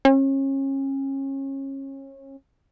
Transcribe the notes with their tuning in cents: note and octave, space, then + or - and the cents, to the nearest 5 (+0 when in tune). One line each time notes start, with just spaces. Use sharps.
C#4 -30